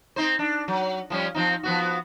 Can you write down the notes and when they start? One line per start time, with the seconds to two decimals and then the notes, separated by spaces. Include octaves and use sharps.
0.16 C4 D#4 C5
0.39 D4
0.68 F#3
1.10 F3 G3 C#4
1.35 F3 C4 D#4
1.63 F3 B3 F#4